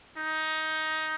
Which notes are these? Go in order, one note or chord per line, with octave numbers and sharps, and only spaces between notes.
D#4